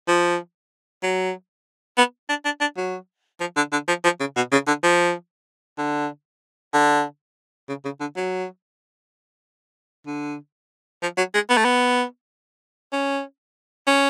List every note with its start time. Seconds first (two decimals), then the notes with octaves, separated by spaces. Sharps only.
0.08 F3
1.03 F#3
1.98 B3
2.29 D4
2.45 D4
2.61 D4
2.77 F#3
3.40 F3
3.56 D3
3.72 D3
3.88 F3
4.04 F3
4.20 C#3
4.36 B2
4.52 C#3
4.67 D3
4.83 F3
5.78 D3
6.74 D3
7.68 C#3
7.85 C#3
8.00 D3
8.16 F#3
10.07 D3
11.02 F3
11.18 F#3
11.34 G#3
11.49 B3
11.57 A3
11.65 B3
12.92 C#4
13.87 C#4